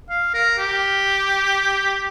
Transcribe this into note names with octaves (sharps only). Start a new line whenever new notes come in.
F5
A#4
G4